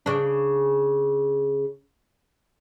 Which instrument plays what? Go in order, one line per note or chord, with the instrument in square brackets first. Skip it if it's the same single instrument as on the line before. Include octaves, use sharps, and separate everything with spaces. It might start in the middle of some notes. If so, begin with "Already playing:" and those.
[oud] C#3 D4